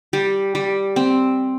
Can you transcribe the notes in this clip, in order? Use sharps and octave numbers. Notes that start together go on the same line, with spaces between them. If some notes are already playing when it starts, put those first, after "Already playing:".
G3
G3
C4